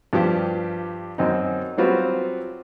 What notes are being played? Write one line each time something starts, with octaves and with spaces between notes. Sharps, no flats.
G2 F3 G4 D6
F#2 C4 D#4
F#3 G3 C4 F4 F#4 B4